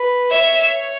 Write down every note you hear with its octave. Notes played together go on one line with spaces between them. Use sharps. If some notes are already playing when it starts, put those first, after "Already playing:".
Already playing: B4
C#5 E5